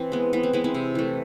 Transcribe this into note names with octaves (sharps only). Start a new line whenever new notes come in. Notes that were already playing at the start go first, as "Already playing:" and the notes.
Already playing: E3 C4
G#3 B3
E3 B3
C4
G#3 B3 C4 E4
C4 E4
C3
E3 A3